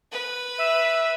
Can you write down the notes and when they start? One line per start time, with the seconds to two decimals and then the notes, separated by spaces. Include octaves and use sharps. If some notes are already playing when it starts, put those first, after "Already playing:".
0.12 B4
0.58 E5